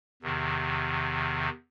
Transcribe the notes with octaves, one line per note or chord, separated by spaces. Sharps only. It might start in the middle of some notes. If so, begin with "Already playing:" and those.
E2 C3 D#3